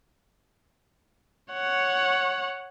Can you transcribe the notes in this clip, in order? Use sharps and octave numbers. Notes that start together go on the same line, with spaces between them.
C#5 F#5